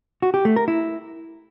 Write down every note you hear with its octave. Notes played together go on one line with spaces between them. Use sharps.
F#4
G4
A3
A#4
E4